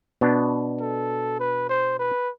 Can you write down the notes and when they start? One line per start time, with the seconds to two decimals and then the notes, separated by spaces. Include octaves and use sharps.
0.21 B2 B3 D4
0.80 A4
1.40 B4
1.69 C5
1.99 B4